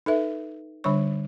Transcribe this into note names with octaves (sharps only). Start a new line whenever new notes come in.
D#4 A4 B4 E5
D3 G3 D4 C#5 C#6